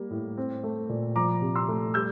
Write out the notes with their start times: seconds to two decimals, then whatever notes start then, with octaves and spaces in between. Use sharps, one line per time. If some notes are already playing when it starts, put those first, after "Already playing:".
Already playing: G3 A#3
0.10 A2
0.38 C4
0.64 A3
0.89 A#2
1.16 F3 A#5 D6
1.42 C3
1.55 C6 E6
1.68 A3
1.94 G3 E6 G6